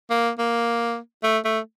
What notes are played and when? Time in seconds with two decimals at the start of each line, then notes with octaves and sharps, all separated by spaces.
0.11 A#3
0.39 A#3
1.24 A3
1.45 A3